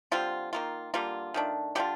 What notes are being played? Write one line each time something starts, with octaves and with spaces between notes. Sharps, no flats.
D3 G3 C4 F4
D#3 A#3 F4
D3 G3 A#3 F4
D#3 A3 D4
D3 G3 D4 F4 G4